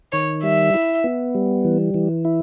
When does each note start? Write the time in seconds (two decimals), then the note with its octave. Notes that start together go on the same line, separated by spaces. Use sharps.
0.13 D#3 C#5
0.43 G3 E5
0.74 E4
1.04 B3
1.35 G3
1.65 E3
1.94 E3
2.25 E4